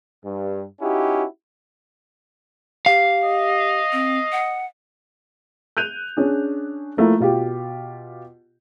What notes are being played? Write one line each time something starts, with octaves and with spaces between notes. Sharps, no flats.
G2
C#4 D#4 E4 F#4 G4
G4 F5
D#5
C4
F#5
F#6 G6 D#7 F7
C#4 D4 G#4
F3 A3 A#3 E4
B2 F4 G4